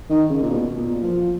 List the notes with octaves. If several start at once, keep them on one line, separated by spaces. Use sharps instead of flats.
D#3
C#3
A#2
B2
A#2
F3